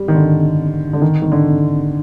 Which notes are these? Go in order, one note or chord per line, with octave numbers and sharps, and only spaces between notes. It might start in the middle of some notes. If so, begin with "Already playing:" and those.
Already playing: G3
D#3
D3
D3
D#3
D#3
D3